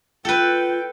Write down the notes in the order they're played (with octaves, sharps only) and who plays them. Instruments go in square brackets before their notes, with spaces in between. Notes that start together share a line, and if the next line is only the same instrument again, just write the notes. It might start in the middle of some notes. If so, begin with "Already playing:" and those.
[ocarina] F4 [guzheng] A4 B4 [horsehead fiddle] G5